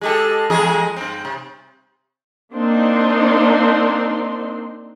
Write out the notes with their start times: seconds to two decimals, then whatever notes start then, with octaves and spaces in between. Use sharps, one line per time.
0.01 G#3 G4 A4
0.50 E2 G#3 G#4
0.96 G2 C4
1.25 C3
2.53 A#3 C4 D4 D#4 C6